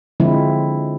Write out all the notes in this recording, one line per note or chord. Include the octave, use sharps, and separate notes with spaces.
D3 F3 G#3 C4 E4